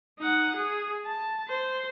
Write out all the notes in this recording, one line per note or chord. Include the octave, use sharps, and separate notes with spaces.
D#4 F#5
G#4
A5
C5